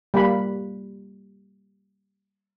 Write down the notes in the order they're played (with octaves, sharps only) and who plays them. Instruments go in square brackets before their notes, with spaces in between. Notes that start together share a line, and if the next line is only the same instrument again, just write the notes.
[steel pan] G3 A#3 B5